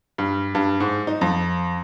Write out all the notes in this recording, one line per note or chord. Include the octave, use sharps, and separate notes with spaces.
G2
G2
G#2
D#4
F2